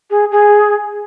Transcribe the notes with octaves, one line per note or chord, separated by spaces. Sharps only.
G#4
G#4